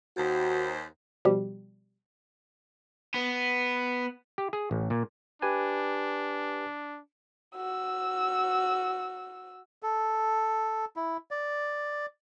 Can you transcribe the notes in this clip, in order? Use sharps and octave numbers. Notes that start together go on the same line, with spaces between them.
D#2 F#4 C5
B2 F3 G3 G4
B3
G4
G#4
A1
A#2
D4 G4 B4 G#5
F#4 E6
A4
E4
D5